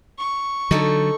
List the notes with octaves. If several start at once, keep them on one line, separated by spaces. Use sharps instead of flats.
C#6
D3 F#3 D#4 A4